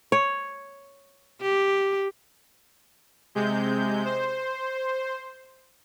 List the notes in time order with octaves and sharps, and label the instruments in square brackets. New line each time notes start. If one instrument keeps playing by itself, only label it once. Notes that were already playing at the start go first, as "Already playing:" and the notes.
[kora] C#5
[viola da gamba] G4
[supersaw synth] C3 G#3 G6
C5